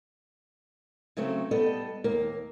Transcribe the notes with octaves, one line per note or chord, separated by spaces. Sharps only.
C#3 F#3 A3 C4
G3 B3 A4 D#5
D#2 A#3 A#4